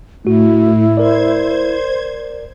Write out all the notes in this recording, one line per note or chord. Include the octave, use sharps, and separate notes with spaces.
A2 A3 E4 F#4
A#4 C5 D5 G#6